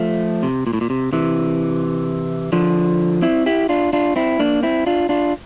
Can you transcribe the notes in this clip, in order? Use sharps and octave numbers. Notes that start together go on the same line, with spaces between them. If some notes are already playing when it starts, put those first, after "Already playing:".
Already playing: F3 A3
C3
A#2
A2
A#2
C3
C3 E3
D3 F3
C4 E4
E4 G4
D4 F4
D4 F4
C4 E4
A#3 D4
C4 E4
D4 F4
D4 F4